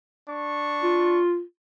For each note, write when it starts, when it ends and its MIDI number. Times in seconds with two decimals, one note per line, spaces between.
0.27 1.21 62
0.27 1.21 85
0.83 1.42 65